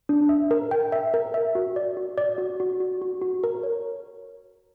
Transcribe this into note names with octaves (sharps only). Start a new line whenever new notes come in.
D4
E5
A#4
G5
E5
A#4
E5
F#4
D5
F#4
D5
F#4
F#4
F#4
F#4
F#4
A#4
C#5